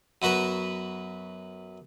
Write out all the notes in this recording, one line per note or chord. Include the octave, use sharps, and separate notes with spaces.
F#2 B3 F#4 B4 A#5